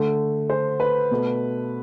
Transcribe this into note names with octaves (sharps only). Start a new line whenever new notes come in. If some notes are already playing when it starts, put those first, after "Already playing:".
Already playing: D3 A3
C5
B4
B2 A3